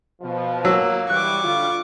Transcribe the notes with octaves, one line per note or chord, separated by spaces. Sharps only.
B2 F3
F#3 A#3 E6
E3 G3 C#6 D6 F#6
D3 G3 F4